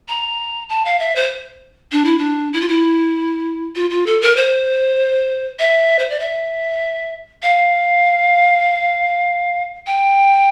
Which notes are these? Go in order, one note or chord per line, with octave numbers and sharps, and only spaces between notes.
A#5
A5
F5
E5
C5
D4
E4
D4
E4
F4
E4
F4
F4
A4
A#4
C5
E5
C5
D5
E5
F5
G5